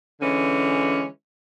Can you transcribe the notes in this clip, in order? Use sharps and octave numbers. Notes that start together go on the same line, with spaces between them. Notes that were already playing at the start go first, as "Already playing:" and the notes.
D3 E3 G#3 C#4